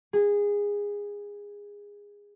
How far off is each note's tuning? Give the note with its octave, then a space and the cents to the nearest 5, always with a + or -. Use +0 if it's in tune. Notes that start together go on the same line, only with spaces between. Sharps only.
G#4 -20